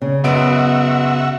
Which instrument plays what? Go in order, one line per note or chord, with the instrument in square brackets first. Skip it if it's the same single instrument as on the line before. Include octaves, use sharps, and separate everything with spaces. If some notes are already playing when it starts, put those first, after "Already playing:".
[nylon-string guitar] C#3 [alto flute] C#5
[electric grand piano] F#2 B3 D7 [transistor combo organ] F#4 E5 [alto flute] D#5